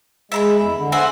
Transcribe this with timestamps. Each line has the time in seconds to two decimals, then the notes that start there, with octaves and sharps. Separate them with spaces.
0.32 G#3 E5 A#5 B5
0.59 E2
0.75 D3
0.92 F#4 C5 E5 G#5